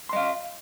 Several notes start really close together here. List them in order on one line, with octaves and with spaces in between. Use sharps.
C6 D#5 F5